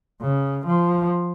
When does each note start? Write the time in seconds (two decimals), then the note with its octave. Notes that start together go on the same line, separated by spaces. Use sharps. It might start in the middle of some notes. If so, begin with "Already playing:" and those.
0.22 C#3
0.66 F3